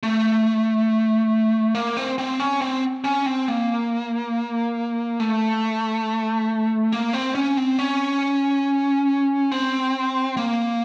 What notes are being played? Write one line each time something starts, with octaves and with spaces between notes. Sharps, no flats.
A3
A#3
C4
C4
C#4
C4
C#4
C4
A#3
A3
A#3
C4
C#4
C4
C#4
C4
A#3